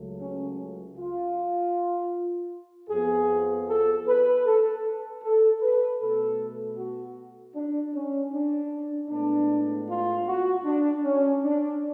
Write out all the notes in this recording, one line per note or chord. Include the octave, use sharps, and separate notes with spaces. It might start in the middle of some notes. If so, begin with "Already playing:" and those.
Already playing: C#2 C#3 F#3 A3
C#4
F4
F2 F3 B3 G#4
A4
B4
A4
A4
B4
B2 A3 A4
F#4
D4
C#4
D4
A2 G#3 B3 D4
F4
F#4
D4
C#4
D4